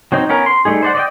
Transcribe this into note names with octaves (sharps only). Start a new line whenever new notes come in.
F#3 C4 D#4
B3 C#4 A#4
C6
G3 A3 D#4 G#4
C5 D5 F#5
D5 D#5 G5